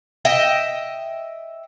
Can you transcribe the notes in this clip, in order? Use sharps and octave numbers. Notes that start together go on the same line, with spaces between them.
D#5 E5 G5